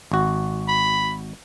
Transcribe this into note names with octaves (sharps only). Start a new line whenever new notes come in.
G#1 F#4
B5